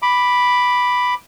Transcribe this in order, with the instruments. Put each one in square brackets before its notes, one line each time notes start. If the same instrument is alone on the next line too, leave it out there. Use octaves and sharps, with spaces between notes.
[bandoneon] B5 D6